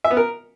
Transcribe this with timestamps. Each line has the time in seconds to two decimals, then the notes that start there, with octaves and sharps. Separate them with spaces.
0.04 E5
0.11 B3
0.17 A#4